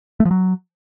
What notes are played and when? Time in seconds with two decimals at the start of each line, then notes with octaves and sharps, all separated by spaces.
0.20 A3
0.25 F3
0.31 F#3